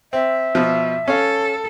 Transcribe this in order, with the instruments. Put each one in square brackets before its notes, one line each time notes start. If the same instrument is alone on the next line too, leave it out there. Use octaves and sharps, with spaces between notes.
[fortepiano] C4 [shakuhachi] E5
[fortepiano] B2 F3
[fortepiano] C#4 F5 [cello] A4